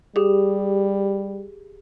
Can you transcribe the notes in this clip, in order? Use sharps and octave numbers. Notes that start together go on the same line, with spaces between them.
G3 G4 G#4